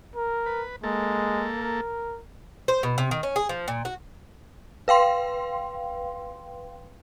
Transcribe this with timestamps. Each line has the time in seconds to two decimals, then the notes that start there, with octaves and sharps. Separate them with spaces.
0.16 A#4
0.46 B4
0.83 G#3 A#3 A4
1.59 A#4
2.68 C5
2.83 B2
2.98 C3
3.11 D#3
3.23 C#4
3.36 G#4
3.49 F3
3.68 A#2
3.85 F#4
4.88 B4 F5 G5 C6